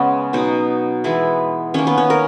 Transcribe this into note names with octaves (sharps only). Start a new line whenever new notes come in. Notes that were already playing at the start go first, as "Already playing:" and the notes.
Already playing: C#3 G#3 B3 C#4
B2 F#3 B3 D#4
E3 G#3 B3 E4
D#3 A#3 C#4
B3
C#4
A#4